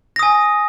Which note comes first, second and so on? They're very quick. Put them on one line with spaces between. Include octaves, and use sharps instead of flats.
A#6 D#6 G#5